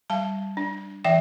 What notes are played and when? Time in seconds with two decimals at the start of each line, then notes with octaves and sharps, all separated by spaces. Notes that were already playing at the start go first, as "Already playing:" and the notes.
0.10 G3 F5 A5
0.57 D4
1.04 E3 E5 G5